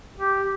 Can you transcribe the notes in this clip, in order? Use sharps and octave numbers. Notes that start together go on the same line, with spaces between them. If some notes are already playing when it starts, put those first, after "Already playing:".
G4